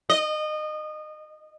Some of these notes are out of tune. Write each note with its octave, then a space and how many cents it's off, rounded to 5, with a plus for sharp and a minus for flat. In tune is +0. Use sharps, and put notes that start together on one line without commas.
D#5 -25